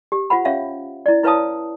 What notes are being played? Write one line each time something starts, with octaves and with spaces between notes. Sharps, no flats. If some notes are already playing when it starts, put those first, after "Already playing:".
G4
F4 C5 F#5 B5
C#4 C#5 E5 F5
E4 D5
E4 B4 C#5 F5 A5 D#6